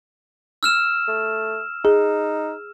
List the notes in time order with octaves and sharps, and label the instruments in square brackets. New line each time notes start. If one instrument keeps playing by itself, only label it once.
[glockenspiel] E6 F6 E7
[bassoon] A3
[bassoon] D#4 [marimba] G#4